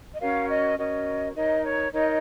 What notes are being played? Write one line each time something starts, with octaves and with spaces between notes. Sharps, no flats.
D#5
C#4 F#4 A#4 C#5 F5
D#5
C#4 F#4 A#4 C#5 D#5
D#4 A#4 C#5 D#5
C#5
D#4 A#4 C#5 D#5